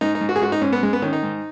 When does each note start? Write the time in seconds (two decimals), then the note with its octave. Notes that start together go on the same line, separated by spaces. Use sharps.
0.01 G#2 D#4
0.15 D#4
0.21 G#2
0.29 F#4
0.36 G#4
0.41 G#2 F#4
0.52 D#4
0.62 G#2 C#4
0.73 B3
0.83 G#2 G#3
0.93 B3
1.02 D#3 C#4
1.13 D#4
1.23 G#2